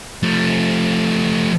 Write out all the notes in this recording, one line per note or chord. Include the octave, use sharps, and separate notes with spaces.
F3 A3